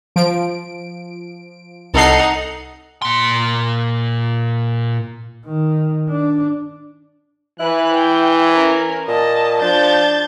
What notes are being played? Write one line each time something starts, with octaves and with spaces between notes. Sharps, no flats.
F3 D7
C2 D#4 A4 F#5 C7
A#2 C6
D#3
D4
E3 E4 B4 F#6
G5
C#4 A#4
A#2 D#5 A5
F3 D4 G6 A6